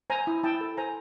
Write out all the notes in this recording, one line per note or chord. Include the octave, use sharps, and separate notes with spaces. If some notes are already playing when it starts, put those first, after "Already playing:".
C5 G#5 A#5
E4
E4 G5 A5
A4
C5 G#5 A#5